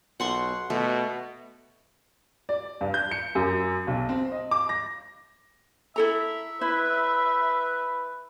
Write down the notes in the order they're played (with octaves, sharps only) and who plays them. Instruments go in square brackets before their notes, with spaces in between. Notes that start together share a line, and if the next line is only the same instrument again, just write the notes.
[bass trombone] B1 [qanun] F#5 C6 C#6
[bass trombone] B2 [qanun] A3
[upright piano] D5
G2
G6
C#7
F#2
B1
C4
D#5
D6
A#6
[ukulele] E4 A4 A#5 [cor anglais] E5
[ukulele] E4 [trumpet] B4